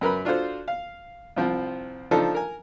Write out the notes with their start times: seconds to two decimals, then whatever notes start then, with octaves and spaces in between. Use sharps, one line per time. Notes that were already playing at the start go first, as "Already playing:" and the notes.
0.01 F#2 A#4 B4 B5
0.25 D4 F4 F#4 A4 C5
0.68 F5
1.36 C2 F3 C4
2.11 F3 D4 D#4 F4 A4
2.34 A#4 G#5